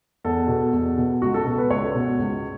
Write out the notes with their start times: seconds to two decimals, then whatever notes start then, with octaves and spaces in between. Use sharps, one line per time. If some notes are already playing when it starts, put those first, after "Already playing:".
0.24 E2 A4
0.48 B2
0.73 E2
0.97 B2
1.22 C#2 F#4
1.34 A4
1.46 B2 A4
1.58 B4
1.70 C#2 C#5
1.95 B2
2.19 C#2